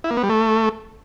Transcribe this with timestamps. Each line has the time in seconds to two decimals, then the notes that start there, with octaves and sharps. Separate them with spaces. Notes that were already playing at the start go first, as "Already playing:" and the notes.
0.04 E4
0.11 A#3
0.17 B3
0.23 G3
0.30 A3